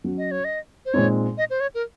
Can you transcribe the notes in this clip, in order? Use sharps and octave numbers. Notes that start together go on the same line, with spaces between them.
F#3 C#4 F#4
D#5
C#5
D#5
C5
A#2 G#3 C4 D#4 C#5
D#5
C5
C#5
A#4